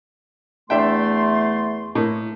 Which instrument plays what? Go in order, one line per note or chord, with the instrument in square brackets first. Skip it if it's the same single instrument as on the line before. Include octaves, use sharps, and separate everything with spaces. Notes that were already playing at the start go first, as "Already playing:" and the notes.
[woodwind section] E2 A3 C6 [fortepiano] D4 E5 G5
[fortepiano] A2 A#3